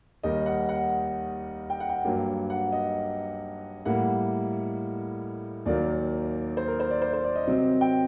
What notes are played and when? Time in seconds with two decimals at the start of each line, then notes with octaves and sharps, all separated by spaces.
0.23 D#2 D#3 G3 D#5
0.46 F#5
0.69 F#5
1.70 G5
1.80 F#5
1.90 G5
2.05 G2 F#3 A#3
2.50 F#5
2.72 D#5
3.85 A2 G3 A#3 F#5
5.66 D#2 D#3 F#3 A#3 D5
6.57 C5
6.68 A#4
6.80 C5
6.91 D5
7.02 C5
7.13 C5
7.24 D5
7.36 D#5
7.47 C3 F#3 C4
7.81 G5